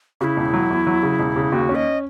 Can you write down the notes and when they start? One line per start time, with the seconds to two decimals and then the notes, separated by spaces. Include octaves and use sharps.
0.21 C#3 F#4
0.24 E4
0.37 E1
0.54 F#3
0.70 E2
0.87 F#3
1.03 C#3
1.19 E1
1.36 C#3
1.52 D#2 F#4
1.69 C#4
1.75 D#5